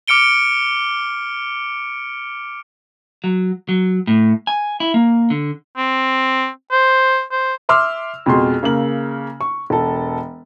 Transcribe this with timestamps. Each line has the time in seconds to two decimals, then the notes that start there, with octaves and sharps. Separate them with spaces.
0.08 D6 F6 C#7 D7 G7
3.24 F#3
3.69 F#3
4.07 A2
4.47 G#5
4.80 E4
4.94 A#3
5.30 D3
5.77 C4
6.71 C5
7.31 C5
7.69 E5 C6 D6 E6 F6
8.26 F2 B2 G#3 C6
8.63 C#3 A#3 F#7
9.41 C#6
9.70 E1 A4